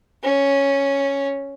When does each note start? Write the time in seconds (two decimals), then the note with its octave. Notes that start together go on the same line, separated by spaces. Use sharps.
0.24 C#4